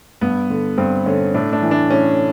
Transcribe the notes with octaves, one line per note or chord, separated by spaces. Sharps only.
G2 B3
D3
G2 C4
D3 C#4
A2 D4
D4
E3
D4
A2 C#4